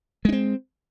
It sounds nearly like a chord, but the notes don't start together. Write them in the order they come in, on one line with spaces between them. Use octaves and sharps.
G#3 D4 C4